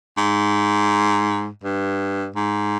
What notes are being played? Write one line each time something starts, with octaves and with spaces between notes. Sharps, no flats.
G#2
G2
G#2